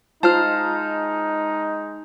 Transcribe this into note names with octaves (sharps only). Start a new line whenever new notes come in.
G#3 D#4 F4 C5 A5 F6